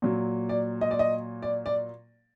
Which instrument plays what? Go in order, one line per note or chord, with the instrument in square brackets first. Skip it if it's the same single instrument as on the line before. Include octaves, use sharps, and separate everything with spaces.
[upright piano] A#2 F#3
D5
D#5
D5
D#5
D5
D5